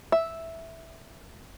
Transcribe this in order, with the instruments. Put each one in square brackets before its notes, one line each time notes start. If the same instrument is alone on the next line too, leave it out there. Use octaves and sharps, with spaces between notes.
[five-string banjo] E5